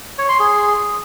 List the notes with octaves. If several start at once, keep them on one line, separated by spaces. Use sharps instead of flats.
C#5
C6
G#4